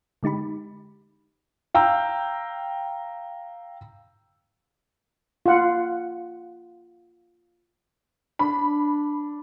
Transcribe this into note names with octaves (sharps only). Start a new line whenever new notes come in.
D3 G#3 D#4 G4 B5
F5 G5 A#5 E6
F4 F#5
D4 B5